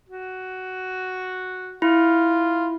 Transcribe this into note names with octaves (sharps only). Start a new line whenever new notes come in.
F#4
E4 F4